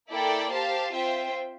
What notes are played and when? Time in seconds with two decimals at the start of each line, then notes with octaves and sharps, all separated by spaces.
0.11 A#3 E4 A4 D5 G5
0.52 G4 C5 F5 A5
0.91 C4 F4 C5 E5 G5